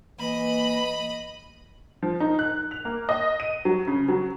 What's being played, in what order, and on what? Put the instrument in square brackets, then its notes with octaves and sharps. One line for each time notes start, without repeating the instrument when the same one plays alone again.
[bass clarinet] E3 [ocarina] A#3 [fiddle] D#5 B5
[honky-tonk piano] F3
D#4
F#6
F7
A#3
D#5
D#7
F#3
C#3
F#3